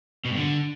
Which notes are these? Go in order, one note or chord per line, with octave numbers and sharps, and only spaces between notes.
B2
G2
D3